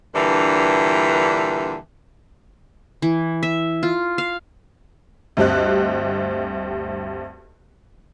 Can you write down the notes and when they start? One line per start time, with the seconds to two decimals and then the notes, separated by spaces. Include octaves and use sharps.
0.15 G2 A#2 D3 E3
3.02 E3
3.43 E5
3.83 F4
4.18 F5
5.37 D2 G2 C4 G4 D#5 F#6